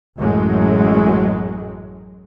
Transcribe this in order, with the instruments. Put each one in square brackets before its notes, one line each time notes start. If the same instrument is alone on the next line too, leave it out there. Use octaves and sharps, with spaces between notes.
[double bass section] A1 F#2 A2 F#3 G#3